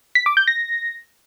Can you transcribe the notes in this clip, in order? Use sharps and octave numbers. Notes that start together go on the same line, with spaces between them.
B6
D6
G6
A#6